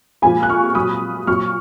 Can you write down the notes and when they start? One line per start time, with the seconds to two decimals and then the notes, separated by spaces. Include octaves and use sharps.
0.22 A#2 F3 G#3 G#5 B5
0.43 F#6
0.49 C#6 F6
0.75 A#2 F#3 B5 D#6
1.27 A#2 F#3 C#6 F6